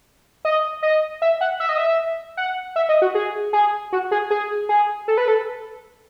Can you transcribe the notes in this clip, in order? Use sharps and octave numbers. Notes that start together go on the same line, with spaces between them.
D#5
D#5
E5
F#5
E5
D#5
E5
F#5
E5
D#5
F#4
G#4
G#4
F#4
G#4
G#4
G#4
A4
B4
A4